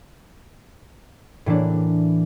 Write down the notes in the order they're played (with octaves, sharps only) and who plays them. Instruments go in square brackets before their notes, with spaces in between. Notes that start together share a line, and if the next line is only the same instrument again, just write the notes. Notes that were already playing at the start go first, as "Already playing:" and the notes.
[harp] A2 E3 A#3 D4